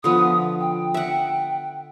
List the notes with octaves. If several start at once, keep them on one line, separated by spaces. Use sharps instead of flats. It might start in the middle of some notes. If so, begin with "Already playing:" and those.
D3 F3 B3 D#6
G5
E5 F#5